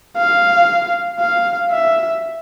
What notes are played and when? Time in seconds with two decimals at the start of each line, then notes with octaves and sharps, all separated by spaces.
0.18 F5
1.20 F5
1.71 E5